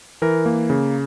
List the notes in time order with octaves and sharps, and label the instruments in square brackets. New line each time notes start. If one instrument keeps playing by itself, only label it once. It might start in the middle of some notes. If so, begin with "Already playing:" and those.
[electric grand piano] E3 A#4
A#3
C#3